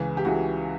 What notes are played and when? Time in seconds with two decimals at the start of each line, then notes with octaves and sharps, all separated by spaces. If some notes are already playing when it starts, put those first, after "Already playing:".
Already playing: C#2 C#3 E3 E4
0.17 G4
0.25 C#2 C#3 E3 F#4